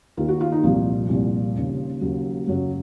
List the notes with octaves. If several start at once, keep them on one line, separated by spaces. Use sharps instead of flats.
D#2 D#3 F4
F#4
F4
D#4
C2 A#2 F3
C2 A#2
D#2 C#3
D#2 C#3 F#3
F#2 C#3 F#3